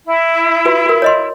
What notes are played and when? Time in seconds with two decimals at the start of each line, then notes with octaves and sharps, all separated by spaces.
0.05 E4
0.65 F4 F#4 B4
0.86 F#4 A#4
1.02 C#5 D#5 C6